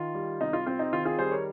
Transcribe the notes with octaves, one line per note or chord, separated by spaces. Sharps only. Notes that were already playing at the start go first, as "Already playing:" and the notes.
Already playing: D#3 F4
G3
C3 D#4
F4
C4 F4
D#4
D#3 F4
F4 G#4
G3 G#4 C5
A#4 C#5